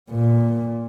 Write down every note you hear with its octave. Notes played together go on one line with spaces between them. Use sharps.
A#2